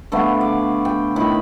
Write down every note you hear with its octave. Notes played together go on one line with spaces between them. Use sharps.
D3 A3 B3 F5
D5
G5
A2 D#3 B5